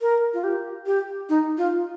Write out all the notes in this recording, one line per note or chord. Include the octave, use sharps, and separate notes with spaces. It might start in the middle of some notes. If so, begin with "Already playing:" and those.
A#4
F4
G4
G4
D#4
F4